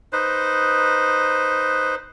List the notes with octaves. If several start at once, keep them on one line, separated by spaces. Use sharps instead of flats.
D#4 B4 C5